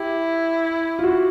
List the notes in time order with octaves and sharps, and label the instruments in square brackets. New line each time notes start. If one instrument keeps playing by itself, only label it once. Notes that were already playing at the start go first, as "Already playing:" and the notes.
Already playing: [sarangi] E4 [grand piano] G4
[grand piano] F4
F#4